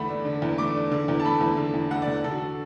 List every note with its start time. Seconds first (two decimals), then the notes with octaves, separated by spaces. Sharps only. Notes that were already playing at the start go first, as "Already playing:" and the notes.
Already playing: E2 D3 A3 F#5 B5
0.09 D4
0.25 D3
0.42 E2
0.58 A3 D6
0.74 D4
0.92 D3
1.08 E2
1.20 A5
1.25 A3 B5
1.41 E2
1.57 D3
1.74 E2
1.91 A3 F#5
2.02 D5
2.08 E2
2.24 D3 A4
2.31 F#4
2.38 A4